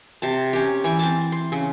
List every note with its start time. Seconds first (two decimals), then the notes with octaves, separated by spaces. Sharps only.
0.22 C3 A5
0.53 C#4 G4
0.84 E3 G#5
0.99 C4 A5
1.32 C6
1.52 C#3